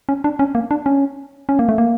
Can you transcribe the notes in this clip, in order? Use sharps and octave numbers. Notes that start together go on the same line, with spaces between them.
C#4
D4
C#4
A#3
D4
C#4
C#4
A#3
A3
A#3